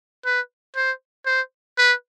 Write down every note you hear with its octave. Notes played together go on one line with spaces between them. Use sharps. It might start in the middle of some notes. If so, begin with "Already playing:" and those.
B4
C5
C5
B4